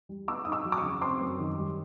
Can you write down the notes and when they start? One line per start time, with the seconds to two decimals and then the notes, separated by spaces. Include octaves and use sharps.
0.09 G3
0.28 B3 D6 E6
0.45 D#4 D#6
0.52 D6 E6
0.65 F#3
0.72 D6
0.77 C#6 D#6
0.83 C#3
1.01 C4 C6 D6
1.21 F#2
1.39 D#3
1.57 G3